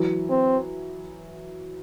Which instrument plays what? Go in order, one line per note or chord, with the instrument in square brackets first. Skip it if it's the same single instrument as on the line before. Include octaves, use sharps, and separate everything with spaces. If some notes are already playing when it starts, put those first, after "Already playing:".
Already playing: [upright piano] E3 F#3
[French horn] C4